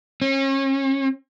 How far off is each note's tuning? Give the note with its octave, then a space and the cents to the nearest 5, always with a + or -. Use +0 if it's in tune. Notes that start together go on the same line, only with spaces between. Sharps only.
C#4 -35